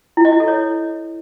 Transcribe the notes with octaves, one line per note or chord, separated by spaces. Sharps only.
E4
D#5
E4
A4
C#5